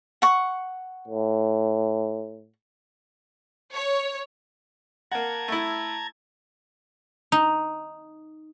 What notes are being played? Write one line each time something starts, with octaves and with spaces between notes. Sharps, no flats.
F#5 C#6
A2
C#5
A#3 F#5 A5 A#5 G#6
A3 E4
D#4